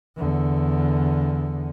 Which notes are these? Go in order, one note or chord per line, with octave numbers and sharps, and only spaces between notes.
E2 D3